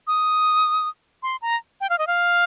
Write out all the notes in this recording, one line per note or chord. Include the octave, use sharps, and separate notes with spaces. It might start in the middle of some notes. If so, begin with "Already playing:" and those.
D#6
C6
A#5
G5
F5
D#5
F5